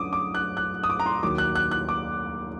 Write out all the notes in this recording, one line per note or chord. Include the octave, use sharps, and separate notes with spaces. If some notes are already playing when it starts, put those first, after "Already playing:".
Already playing: F#2 D3 D6 D#6
D6
F#6
F#6
D#6
D6
A#5
C6
D#2 D#3 F#3 D6
F#6
F#6
F#6
D6